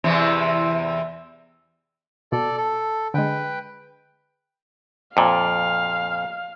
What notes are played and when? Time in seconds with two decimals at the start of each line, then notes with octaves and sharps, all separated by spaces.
0.04 E2 C3 E3
2.32 B2 A4 D5
2.58 A4
3.14 D3 G#3 B4 G5
5.17 F2 A#2 F5